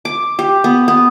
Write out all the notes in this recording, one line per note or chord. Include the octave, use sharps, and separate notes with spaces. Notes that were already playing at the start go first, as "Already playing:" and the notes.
D6
G4
B3
B3